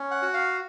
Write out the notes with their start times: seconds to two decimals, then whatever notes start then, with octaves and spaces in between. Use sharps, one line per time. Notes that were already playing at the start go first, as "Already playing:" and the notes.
Already playing: C#4
0.11 F#5
0.22 F#4
0.34 F5